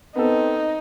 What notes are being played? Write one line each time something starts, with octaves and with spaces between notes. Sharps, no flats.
B3 C4 D#4 A4